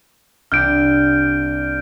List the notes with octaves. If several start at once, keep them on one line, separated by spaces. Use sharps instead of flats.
C2 D4 G4 F6 G6 D7